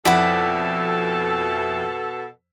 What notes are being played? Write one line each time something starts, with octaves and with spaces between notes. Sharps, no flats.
F2 B2 E4 A4 D5 F#5 B5 B6